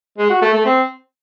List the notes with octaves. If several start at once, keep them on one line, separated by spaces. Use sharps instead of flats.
G#3
F#4
A3
A3
C4